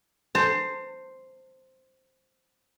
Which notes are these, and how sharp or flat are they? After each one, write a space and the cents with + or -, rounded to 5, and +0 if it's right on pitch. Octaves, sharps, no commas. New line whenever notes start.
C5 +0 A5 +35